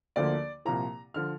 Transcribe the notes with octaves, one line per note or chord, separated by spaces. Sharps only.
D2 D3 F3 A#3 D5
C2 A#2 F3 A#3 A#5
D3 F3 F6